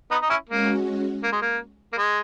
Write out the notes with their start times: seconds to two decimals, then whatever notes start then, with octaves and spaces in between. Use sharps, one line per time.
0.11 B3 D#4
0.22 D#4
0.30 C#4 E4
0.49 G#3 A#3 C#4 F#4
1.23 A#3
1.32 G#3
1.42 A#3
1.93 A#3
1.97 G#3